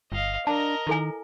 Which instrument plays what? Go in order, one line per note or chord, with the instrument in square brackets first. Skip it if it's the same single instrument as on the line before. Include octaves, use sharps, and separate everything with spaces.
[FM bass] G1 [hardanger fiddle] D#5 F5
[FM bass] D4 [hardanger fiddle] A#4 D#5 [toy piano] A5
[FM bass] D#3 [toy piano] E4 A4 G#5